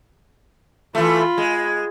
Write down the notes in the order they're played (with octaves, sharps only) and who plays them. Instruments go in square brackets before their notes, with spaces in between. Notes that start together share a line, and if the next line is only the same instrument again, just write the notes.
[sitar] E3 A3 [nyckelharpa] F4 B5
[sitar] G#3